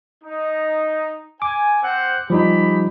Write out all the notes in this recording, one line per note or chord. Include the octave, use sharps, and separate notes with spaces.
D#4
G#5 D6
C4 C5 F#5
F3 G3 G#3 D#4 G4 B5